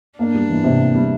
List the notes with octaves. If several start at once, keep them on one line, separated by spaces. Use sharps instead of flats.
A#3 D4
G3
E3
C3
A#3
G3